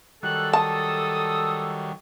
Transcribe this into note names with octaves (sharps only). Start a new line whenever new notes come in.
D#3 F#3 G3 A4 F#6
A5 D#6